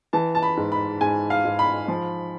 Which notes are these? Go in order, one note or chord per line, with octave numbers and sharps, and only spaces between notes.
E3 A5
A5
B5
G#2
B5
G#2 G#5
F5
G#2
B5
F3